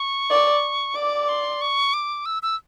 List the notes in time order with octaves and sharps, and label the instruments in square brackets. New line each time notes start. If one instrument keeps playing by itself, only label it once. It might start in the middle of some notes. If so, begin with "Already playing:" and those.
Already playing: [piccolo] C#6
[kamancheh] D5
[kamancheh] D5 [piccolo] D6
[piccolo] C6
C#6
D6
E6
E6